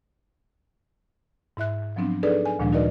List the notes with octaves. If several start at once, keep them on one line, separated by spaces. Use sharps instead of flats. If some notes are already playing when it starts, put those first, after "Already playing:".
G#2 E4 E5 F#6
F3 F#3 B3 C4 D4
D4 D#4 G#4 A4 B4 D5
G#5
D2 A#2 D#3 F3 G#3 D4
D#4 F#4 A#4 B4 D5 D#5